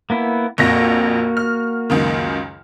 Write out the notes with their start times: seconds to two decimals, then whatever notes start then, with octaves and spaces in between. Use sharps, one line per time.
0.10 A#3 B3 E4
0.58 A#1 F2 A#3 F#4 A#6
1.37 F6
1.90 C#2 F#2 D#3